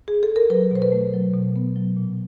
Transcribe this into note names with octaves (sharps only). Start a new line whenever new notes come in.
G#4
A4
A#4
F#3 B4
B2 C5
B4
A3
F#3
B2
B3
F#3
A#2